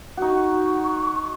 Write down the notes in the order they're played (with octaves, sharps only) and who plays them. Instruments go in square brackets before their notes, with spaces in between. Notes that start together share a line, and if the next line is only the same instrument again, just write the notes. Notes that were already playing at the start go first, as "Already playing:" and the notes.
[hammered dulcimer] D#4 F#4 [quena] C#6